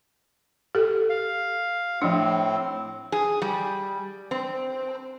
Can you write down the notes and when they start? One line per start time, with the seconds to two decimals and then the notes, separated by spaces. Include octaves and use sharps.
0.75 G4 A4
1.10 F5
2.02 A2 F3 C4 D4
3.12 G#4
3.42 G3
4.31 C4